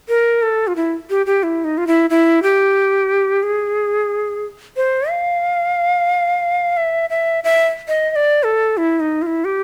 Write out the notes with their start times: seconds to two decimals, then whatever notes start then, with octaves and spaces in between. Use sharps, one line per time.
0.09 A#4
0.42 A4
0.67 F4
0.76 E4
1.10 G4
1.26 G4
1.43 E4
1.64 D#4
1.78 F4
1.87 E4
2.10 E4
2.43 G4
3.43 G#4
4.77 C5
5.10 F5
6.77 E5
7.10 E5
7.44 E5
7.88 D#5
8.11 D#5
8.16 D5
8.43 A4
8.77 E4
9.00 D#4
9.22 F4
9.26 E4
9.45 G4